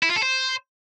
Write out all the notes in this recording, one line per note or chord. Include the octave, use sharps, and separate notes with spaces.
E4
F4
A4
C5